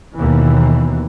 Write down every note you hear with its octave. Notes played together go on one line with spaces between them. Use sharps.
D#2 B2 E3